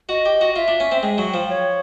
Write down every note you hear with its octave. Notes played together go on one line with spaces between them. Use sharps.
F#4 D#5
G4
F#4
F4 E5
D4
C#4
C4
G#3 G5
F#3
F3
C#5